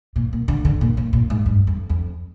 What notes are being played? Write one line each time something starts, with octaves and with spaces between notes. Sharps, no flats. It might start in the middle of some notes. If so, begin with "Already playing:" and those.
A#2
A#2
D3
D3
A#2
A#2
A#2
G#2
G2
F2
F2